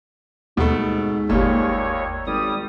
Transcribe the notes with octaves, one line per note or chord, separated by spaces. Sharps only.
D#2 G#2 B2 A3
G1 D#2 A#2 G3 C#5
G#1 G3 D#6